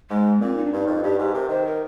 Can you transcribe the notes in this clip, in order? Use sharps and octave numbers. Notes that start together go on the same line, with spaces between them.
G#2 G#3
A#2 C4
D#4
D4
G2 D#4
F2
G2 G4
G#2 G4
C3 A#4
D#3 C5
A#4